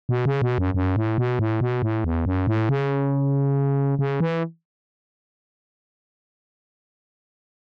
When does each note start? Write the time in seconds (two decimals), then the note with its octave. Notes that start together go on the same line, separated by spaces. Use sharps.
0.09 B2
0.26 C#3
0.42 B2
0.58 F#2
0.74 F#2
0.96 A2
1.18 B2
1.39 A2
1.61 B2
1.82 A2
2.04 E2
2.26 F#2
2.47 A2
2.69 C#3
3.99 C#3
4.20 E3